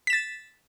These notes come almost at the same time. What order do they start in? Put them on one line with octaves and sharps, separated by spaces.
B6 E7 A6